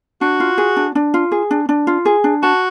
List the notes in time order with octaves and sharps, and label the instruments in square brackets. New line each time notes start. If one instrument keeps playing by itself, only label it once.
[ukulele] D4 [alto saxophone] F#4
[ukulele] F4
G#4
D4
D4
F4
G#4
D4
D4
F4
G#4
D4
[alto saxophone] F#4 [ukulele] A5